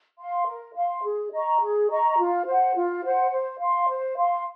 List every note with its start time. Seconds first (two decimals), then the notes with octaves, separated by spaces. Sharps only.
0.18 F5 C6
0.46 A#4
0.74 F5 C6
1.03 G#4
1.32 D#5 A#5 C#6
1.60 G#4
1.89 D#5 A#5 C#6
2.18 F4
2.46 C5 F#5
2.75 F4
3.03 C5 F#5
3.31 C5
3.59 F5 C6
3.89 C5
4.17 F5 C6